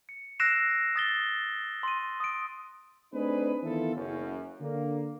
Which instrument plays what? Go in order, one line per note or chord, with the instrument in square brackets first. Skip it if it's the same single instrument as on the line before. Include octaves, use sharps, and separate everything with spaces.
[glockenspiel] C#7
E6 F#6 A#6 C7 D7 E7
D#6 A6 G7
C6 D#7
D#6 D7
[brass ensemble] A3 C4 D4 D#4 G#4 B4
D#3 E3 B3 E4 F4 A4
F#1 F#2
D3 A#3